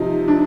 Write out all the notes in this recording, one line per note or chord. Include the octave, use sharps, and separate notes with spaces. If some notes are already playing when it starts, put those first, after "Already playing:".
Already playing: C3 F3 D#4
D4